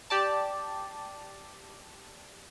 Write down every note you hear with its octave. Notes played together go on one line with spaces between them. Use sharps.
G4 D5 A5